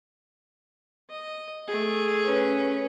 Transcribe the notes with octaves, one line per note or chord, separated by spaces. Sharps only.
D#5
A3 G#4
C#4 B4